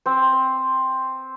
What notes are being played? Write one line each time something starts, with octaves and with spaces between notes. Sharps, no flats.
C4 C5